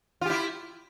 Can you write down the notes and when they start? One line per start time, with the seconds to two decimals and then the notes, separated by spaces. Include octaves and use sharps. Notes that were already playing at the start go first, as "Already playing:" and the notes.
0.21 F4
0.26 G4
0.30 E4